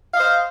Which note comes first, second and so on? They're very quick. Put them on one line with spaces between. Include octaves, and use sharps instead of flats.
F5 D#5 C5